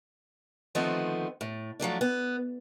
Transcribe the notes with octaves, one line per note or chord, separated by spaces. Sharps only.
D3 D#3 F3 A3 B3 C4
A2
F3 F#3 A3 D4
B3